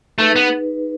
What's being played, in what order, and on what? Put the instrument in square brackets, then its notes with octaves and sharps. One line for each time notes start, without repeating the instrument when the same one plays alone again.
[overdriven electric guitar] A3 [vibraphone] D#4 G#4 B4
[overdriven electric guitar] B3